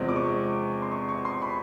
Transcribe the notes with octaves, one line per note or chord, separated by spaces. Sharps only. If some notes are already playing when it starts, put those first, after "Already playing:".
Already playing: E2 C3 F3 G#3 C4
D6
C#6
C6
C#6
C#6
C6
B5